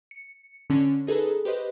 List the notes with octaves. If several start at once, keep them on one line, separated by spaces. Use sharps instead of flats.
C#7
D3 C#4 D4
D#4 G#4 A4 B4 A#5
G4 B4 C5 D#5